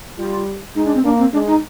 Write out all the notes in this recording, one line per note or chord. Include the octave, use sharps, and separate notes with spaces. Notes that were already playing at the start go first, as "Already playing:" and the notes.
G3 F4
G#3 D#4
D4
C4
A#3 D4
C4
G#3 D4
D#4